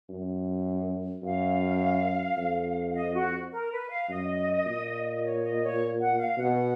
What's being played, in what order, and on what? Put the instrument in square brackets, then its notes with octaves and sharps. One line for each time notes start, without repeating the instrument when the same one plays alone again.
[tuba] F#2
[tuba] F#2 [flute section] F5
[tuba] F2
[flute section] D#5
F#4
A#4
B4
F5
[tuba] F#2 [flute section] D#5
[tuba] A#2
[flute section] C#5
D#5
C#5
F#5
F5
[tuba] B2 [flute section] F#5